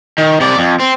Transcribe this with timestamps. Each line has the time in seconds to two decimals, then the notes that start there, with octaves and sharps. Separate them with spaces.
0.18 D#3
0.40 C3 D5
0.58 F2
0.79 C4